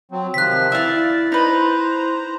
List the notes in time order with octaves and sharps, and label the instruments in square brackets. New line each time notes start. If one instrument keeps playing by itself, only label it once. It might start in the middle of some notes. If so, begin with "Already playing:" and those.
[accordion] F#3 C4
[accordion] C3 D#3 F3 [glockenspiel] F#6 B6
[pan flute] E4 [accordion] D5 [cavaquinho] E5 F5
[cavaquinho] D#4 B4 [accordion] C5 A#5